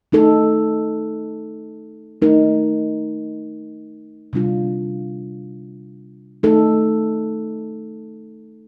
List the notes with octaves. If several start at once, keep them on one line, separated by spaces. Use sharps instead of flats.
A3 D#4 A4
A3 D#4 A#4
C3 G3 D4 F4
A3 D#4 A4